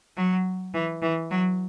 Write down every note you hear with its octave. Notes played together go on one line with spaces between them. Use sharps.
F#3
E3
E3
F#3